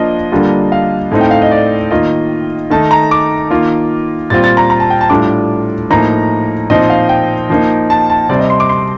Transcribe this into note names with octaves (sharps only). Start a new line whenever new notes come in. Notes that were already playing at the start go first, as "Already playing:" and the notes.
Already playing: F3 A#3 D4 F4 D#5
D3 G3 A#3 D4 F4
F5
A2 A3 C4 D#4
G5
F5
D#5
D5
D#3 A#3 F4 D#5
D#3 A3 D#4 A5
A#5
D6
D#3 A#3 F4
A#2 G3 C4 F4 A6
A6
A#5
A#5
A5
G5
A5
A2 G3 D4 F4 D6
A2 F3 A#3 D#4 A#5
A#2 F3 C4 D#4 D#5
F5
G5
F3 A#3 D#4
A5
A5
C3 G3 C4 D5
D#5
C6
D6
C6